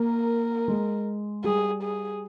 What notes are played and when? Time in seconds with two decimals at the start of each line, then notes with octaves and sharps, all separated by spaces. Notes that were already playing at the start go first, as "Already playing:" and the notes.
Already playing: A#3 A#4
0.68 G#3
1.44 G3 G#4
1.83 G#4